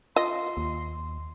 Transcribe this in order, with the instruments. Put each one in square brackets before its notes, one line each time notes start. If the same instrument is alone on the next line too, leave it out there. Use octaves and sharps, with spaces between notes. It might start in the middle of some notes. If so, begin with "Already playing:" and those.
[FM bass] F4 [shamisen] D#5 [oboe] C6
[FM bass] D#2